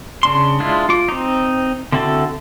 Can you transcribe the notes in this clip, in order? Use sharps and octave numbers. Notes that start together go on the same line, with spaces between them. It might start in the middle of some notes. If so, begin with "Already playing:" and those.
C#3 D4 C6
G#3 D4 E4 F4
F4 D6
C4 D#4
D3 C4 E4 F#4 A4